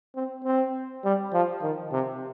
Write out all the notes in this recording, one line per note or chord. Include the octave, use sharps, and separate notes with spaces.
C4
C4
G3
F3
D#3
C3